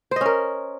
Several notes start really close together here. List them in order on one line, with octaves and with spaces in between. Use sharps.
C5 D#5 C#4 A#4